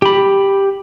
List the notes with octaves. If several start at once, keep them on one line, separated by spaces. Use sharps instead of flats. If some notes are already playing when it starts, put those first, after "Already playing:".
G4 B5